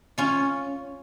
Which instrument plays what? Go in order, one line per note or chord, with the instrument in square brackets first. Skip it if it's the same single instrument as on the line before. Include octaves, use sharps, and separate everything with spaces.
[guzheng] C#4 F4